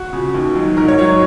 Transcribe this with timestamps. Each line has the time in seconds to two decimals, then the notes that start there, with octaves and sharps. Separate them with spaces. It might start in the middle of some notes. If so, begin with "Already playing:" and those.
Already playing: F#4
0.13 C#3 F3
0.34 D#2
0.55 D#3 F#3
0.77 G#2 A#4
0.88 C#5
0.99 D#3 F#3 C#5